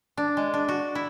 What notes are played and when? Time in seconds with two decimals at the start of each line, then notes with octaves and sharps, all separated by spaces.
0.17 D4
0.37 G#3
0.54 D4
0.69 F#4
0.95 E4